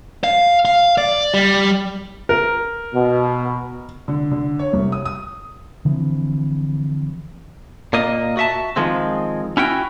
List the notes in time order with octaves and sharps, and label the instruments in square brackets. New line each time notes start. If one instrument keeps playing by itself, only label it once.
[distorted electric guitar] F5
F5
D5
G3
[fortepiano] A#4
[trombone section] B2
[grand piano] D3
D3
C#5
C2
D#6
D#6
[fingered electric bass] D3 E3 F3 C4
[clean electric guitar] A#2 A#3 D#5
F#4 E5 A5
D#3 F3 G#3 C4
C#4 E4 F#4 G5